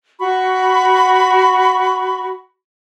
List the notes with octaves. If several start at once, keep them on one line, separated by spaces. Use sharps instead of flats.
F#4 B5 C#6